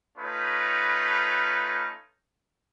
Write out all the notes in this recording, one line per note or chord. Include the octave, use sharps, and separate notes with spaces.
A3 C#4 D#4 F4 B4